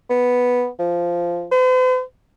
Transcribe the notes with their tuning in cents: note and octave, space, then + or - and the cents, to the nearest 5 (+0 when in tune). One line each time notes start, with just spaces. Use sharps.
B3 -5
F3 -10
C5 -45